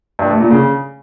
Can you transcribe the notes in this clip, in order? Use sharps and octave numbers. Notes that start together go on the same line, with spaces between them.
G2
A3
A#2
C#3